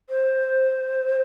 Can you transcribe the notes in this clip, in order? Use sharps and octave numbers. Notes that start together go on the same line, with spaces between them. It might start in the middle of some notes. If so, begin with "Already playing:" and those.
C5